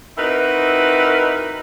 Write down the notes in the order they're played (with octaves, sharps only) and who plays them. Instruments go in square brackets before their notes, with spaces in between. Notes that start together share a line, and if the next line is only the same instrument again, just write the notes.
[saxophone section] C4 D#4 E4 F#4 A#4 B4